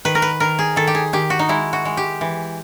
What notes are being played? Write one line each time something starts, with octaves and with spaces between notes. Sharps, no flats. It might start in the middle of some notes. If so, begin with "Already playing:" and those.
D#3 B4
A#4
B4
D#3 A#4
G#4
D#3 A4
G4
G#4
D#3 G4
F#4
D#4
G#3 E4
F#4
G#3
G4
E3